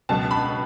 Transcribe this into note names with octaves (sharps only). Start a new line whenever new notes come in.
C#2 B2 F#3 A5
B5